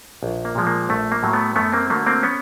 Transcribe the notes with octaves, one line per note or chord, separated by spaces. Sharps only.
A#1
A#3
A#2 F3 G#3
A#3
A#1 A3
A#3
A2 F#3 A3
A3 B3
F#2 A3 B3
A#3 C4
D3 F#3 A3 A#3
A#3 C4
B3 C#4